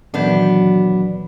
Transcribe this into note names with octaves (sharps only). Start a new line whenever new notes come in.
A#2 D#3 E3 F#3 B3 D4